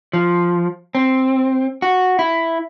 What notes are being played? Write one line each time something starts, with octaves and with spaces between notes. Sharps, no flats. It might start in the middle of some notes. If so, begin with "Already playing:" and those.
F3
C4
F#4
E4